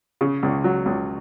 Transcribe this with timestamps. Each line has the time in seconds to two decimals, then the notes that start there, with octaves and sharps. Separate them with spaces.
0.21 C#3
0.43 C#2
0.64 F#3
0.86 C#2